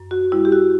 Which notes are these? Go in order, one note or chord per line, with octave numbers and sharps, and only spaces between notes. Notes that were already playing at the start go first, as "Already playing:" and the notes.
Already playing: F#2
F#4
G3 E4
G4
F#4